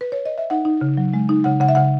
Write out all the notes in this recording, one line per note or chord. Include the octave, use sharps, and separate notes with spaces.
B4
C#5
D#5
E5
D#4 F#5
D#4
C#3
F#3
G#3
D#4
C#3 F#5
C#3 F#5
E5
C#3 F#5